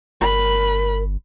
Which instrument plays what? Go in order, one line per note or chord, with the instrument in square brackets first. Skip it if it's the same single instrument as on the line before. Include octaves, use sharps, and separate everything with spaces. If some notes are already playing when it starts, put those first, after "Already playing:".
[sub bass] G1 [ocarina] A#4 [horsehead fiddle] B5